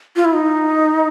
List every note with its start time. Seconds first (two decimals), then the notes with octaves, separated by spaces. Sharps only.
0.16 F4
0.25 E4
0.33 D#4